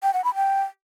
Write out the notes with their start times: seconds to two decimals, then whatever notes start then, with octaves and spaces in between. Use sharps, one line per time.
0.03 G5
0.14 F#5
0.24 B5
0.35 G5